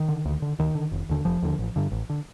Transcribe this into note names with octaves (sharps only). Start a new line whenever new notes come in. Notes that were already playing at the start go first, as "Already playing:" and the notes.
Already playing: D#3
D3
D2
D3
D2 D#3
D3
F1
D#2 D3
F1 F3
D#2 D3
A1
G2 D3
A1
D3